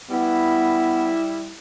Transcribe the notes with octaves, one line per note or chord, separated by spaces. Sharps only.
G3 B3 E4